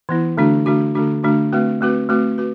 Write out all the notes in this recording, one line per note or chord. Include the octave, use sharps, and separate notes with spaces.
E3 B3 E4
D3 A3 D4 F#4
D3 A3 D4 F#4
D3 A3 D4 F#4
D3 A3 D4 F#4
A3 C4 F#4 B4
A3 C4 F#4 B4
A3 C4 F#4 B4
F#4 B4